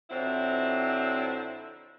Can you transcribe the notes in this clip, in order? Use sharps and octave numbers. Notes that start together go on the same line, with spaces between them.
F2 D3 F#3 C4 E4